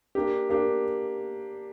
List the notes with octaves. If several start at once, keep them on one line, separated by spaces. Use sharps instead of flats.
A#3 D4 G4
A#3 D4 G4